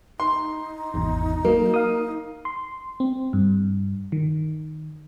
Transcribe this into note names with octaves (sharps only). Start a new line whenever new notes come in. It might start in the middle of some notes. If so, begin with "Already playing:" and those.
D#4 C6
G#1 E2 B2
F#3 A#3
F5 D#6
C6
C4
G2
D#3